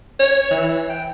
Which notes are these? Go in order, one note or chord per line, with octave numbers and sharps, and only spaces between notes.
C#5
E3
G5